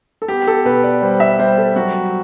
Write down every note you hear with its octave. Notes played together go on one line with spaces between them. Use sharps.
A4
B3 G4
A4
B2 B4
D5
G3 C5
E5
G3 C5
A4
F#3 F#4